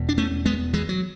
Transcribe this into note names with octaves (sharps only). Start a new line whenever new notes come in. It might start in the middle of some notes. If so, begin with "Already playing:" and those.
Already playing: E1 E2 B2
D4
A3 C#4
G#3 B3
E3 G#3
F#3